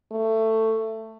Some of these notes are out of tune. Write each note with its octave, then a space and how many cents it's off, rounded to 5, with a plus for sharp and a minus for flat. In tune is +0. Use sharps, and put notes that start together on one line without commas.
A3 +15